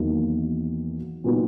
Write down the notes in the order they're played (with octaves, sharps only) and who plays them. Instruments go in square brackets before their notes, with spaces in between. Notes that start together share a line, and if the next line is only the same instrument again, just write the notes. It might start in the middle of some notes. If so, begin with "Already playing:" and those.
Already playing: [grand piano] E2 D#3 F#3 A#3 D#4
A#2 F#3 B3 D#4 F#4